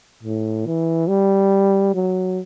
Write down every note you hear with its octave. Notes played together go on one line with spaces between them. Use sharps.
A2
E3
G3
F#3